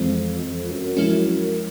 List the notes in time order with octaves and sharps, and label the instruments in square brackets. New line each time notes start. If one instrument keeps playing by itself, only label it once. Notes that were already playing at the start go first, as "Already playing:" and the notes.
Already playing: [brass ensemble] F2 [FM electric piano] E3 G#3 C4
[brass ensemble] F2
F#2
[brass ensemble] F#2 [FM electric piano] F3 G#3 C#4 E4